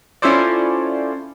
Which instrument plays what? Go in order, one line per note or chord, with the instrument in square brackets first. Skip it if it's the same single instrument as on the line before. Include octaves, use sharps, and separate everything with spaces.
[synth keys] C#4 E4 F4 A4 C5 D5